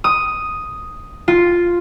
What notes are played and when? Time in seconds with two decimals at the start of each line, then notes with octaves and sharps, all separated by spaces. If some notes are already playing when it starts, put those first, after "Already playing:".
0.04 D#6
1.28 F4